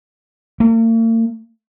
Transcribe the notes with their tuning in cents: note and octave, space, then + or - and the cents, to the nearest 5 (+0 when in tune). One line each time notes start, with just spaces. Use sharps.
A#3 -45